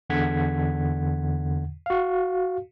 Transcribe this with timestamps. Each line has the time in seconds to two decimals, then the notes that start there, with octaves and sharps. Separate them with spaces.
0.10 E2 D3 F#5 G#6 B6
1.86 F#4 F5